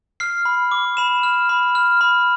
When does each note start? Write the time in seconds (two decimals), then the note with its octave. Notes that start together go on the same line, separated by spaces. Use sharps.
0.20 F6 C7
0.45 B5
0.71 D6
0.97 B5 E7
1.23 F6
1.49 B5
1.75 F6
2.01 B5